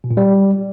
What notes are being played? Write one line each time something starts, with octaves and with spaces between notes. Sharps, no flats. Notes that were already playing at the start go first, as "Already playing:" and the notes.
B2
A#2
G3